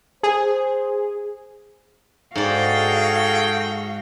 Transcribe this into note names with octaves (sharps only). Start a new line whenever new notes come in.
G#4 C5
G#2 F#4 G#4 A4 D5 F5 G5